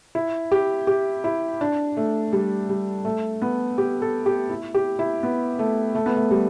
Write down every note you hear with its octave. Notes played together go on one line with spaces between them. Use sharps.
E4
G4
G4
E4
D4
A3
G3
G3
A3
B3
G4
A4
G4
E4
G4
E4
B3
A3
A3
B3
A3
G3